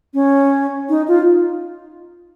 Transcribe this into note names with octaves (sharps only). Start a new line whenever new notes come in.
C#4
D#4
F4